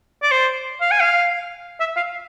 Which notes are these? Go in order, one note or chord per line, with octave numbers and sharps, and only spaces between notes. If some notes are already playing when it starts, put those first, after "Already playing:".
D5
C5
F5
G#5
F5
E5
F5